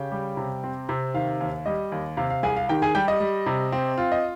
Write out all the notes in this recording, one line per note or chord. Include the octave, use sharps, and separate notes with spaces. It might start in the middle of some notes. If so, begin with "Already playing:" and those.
Already playing: C#3 G4 G5
G3
C3
C4
C3
D#3 F5
D#2
G3 D#5
D#2
C3 F5
F5
C2 G#4 G#5
F5
D#3 G4 G5
G#4 G#5
G3 G4 G5
D#5
G3
C3
C4
F4
D#5